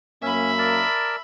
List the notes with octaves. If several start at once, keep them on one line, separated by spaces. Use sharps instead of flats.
F#2 A#3 C#4 E5 B5
A#4 D5 A5